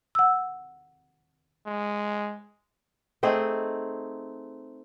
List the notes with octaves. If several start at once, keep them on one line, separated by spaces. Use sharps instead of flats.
F#5 E6
G#3
A3 C4 D#4 G#4